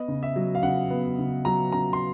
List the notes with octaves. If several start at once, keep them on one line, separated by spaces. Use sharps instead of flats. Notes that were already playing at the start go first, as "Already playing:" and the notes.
Already playing: B3 D#5
C#3
E5
F#3
F5
C#3 F#5
B3
C#3
F#3 A#5
C#3 A#5
C6